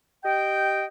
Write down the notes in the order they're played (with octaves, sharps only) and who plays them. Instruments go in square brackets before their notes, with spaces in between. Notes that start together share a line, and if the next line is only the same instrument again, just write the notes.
[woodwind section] G4 D#5 G5